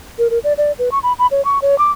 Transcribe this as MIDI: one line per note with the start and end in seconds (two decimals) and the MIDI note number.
0.19 0.28 70
0.30 0.39 70
0.44 0.53 74
0.58 0.72 74
0.79 0.89 71
0.92 0.99 85
1.03 1.13 83
1.19 1.27 83
1.31 1.44 73
1.45 1.59 85
1.62 1.78 73
1.78 1.91 86